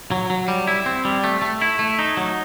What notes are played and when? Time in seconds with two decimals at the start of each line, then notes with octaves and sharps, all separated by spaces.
0.12 F#3
0.30 F#3
0.48 G3
0.67 E4
0.86 C4
1.05 G3
1.24 A3
1.42 A3
1.62 E4
1.79 A3
1.99 D#4
2.17 F#3